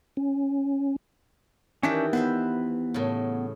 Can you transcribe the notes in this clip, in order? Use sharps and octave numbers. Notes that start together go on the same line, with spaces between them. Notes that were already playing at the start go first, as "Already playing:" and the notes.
C#4
D#3 E3 C#4 D4 G4 E5
B3 B4 C5 E5
A2 C#3